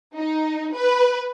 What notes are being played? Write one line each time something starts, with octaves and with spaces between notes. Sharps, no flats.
D#4
B4